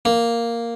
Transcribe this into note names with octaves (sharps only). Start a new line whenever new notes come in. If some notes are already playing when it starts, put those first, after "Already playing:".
A#3